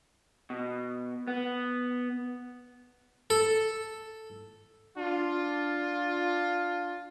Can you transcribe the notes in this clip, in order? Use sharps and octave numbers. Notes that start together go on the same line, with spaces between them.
B2
B3
A4
D4 F4